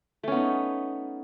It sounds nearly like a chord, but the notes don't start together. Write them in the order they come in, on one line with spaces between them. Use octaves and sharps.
A3 C#4 B3 D#4